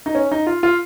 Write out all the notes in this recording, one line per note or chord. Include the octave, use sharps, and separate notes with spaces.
D#4
C#4
D#4
F4
F4